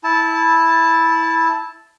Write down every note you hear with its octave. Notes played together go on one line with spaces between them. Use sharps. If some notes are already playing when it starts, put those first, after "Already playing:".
E4 A5